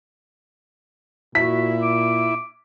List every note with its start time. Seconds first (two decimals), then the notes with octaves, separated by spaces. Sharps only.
1.35 A#2 E4 F#4 B6
1.82 D6